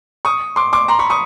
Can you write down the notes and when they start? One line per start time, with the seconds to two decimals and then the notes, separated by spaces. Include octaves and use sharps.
0.25 C#6 D#6
0.56 C6 D6
0.73 C6 D6
0.88 A#5 C6
0.99 B5 C#6
1.10 C#6 D#6